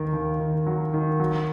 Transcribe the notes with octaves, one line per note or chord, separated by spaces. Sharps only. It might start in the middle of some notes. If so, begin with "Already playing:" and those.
Already playing: D#2 D#3 A#4
D#2
D#3
F#3
D#3
F#3